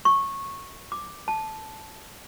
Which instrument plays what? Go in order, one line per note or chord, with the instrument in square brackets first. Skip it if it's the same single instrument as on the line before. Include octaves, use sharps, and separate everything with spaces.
[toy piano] C#6
D6
A5